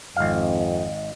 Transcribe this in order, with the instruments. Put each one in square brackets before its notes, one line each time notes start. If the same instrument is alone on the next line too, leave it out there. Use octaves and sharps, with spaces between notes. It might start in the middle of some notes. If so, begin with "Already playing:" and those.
[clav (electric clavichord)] G#1 F5 [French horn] F2 [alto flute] D#5